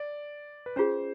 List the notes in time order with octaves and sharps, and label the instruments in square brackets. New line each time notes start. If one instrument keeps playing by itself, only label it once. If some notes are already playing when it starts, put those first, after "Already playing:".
Already playing: [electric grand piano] D5
B4
[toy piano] C#4 F4 G#4 [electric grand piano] C5